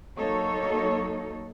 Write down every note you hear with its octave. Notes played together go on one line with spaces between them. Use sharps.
F#3 A#3 D#4 A4 C#5